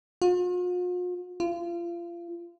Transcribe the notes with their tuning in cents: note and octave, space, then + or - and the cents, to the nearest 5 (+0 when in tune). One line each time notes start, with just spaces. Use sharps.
F4 +45
F4 -30